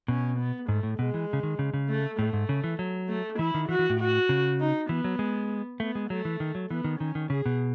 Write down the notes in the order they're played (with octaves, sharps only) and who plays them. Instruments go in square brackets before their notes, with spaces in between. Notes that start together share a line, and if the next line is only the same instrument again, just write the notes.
[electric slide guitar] B2 [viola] C#4
[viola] B3
[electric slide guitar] G#2 [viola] A3
[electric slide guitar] A2
[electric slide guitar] B2 [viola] G#3
[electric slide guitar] E3
C#3
D#3
C#3
C#3
[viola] A3
[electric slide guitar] A2 [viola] A3
[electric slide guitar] G#2
C#3
E3
F#3
[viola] A3
[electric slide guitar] E3 [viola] E4
[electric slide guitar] D#3
[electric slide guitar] E3 [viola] F#4
[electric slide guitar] E3
A2
[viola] F#4
[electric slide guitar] C#3
[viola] D#4
[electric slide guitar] E3 [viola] B3
[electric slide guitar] F#3
G#3
[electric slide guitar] A3 [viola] B3
[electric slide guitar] G#3
[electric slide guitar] F#3 [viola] A3
[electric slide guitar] E3
D#3
F#3
[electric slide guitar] E3 [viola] B3
[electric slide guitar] D#3
[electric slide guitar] D#3 [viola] C#4
[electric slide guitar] D#3
[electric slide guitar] C#3 [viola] G#4
[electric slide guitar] B2